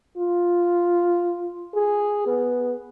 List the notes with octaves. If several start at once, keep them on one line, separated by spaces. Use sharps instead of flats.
F4
G#4
B3